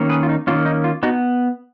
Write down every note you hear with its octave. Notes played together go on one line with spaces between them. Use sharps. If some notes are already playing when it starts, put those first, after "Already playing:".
Already playing: D#3 A#3 C#4
G#4 B4
F4
D#4
D#3 A#3 C#4 F4
D#4
F4
B3 D#4 F#4